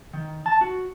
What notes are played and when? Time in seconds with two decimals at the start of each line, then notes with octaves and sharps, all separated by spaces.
0.13 D#3
0.46 A5
0.61 F#4